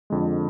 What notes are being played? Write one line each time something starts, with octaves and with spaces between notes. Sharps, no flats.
F2 D3 G#3